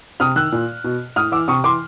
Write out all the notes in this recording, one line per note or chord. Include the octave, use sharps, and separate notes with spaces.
C3 D#6 F6
D#3 E6 F#6
A#2
B2
A2 D#6 F6
E3 D6 E6
C3 C#6 D#6
E3 C6 D6